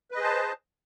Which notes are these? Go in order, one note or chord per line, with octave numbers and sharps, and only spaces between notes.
G#4 B4 C5 D#5 A5